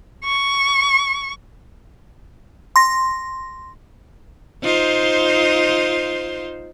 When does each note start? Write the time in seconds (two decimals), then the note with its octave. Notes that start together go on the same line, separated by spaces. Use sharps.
0.25 C#6
2.76 C6 A#6
4.63 D#4 F4 C5